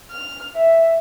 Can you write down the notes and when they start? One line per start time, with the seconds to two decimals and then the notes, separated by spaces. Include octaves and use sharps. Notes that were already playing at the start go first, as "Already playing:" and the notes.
0.11 F6
0.55 E5